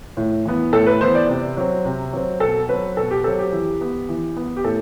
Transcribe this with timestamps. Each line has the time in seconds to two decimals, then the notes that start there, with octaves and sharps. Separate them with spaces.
0.17 A2
0.45 E3 B3
0.72 A2 A4
0.86 B4
1.01 E3 B3 C5
1.15 D5
1.29 C3
1.57 F#3 C4
1.85 C3
2.13 F#3 C4
2.40 B2 A4
2.68 F#3 C4 B4
2.97 B2 A4
3.11 G4
3.24 F#3 C4 A4
3.39 G4
3.52 E3
3.81 B3
4.09 E3
4.37 B3
4.57 G4
4.64 A2 A4